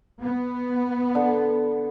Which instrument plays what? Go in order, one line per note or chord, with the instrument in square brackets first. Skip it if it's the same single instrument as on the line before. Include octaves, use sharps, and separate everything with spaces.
[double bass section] B3
[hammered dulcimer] D3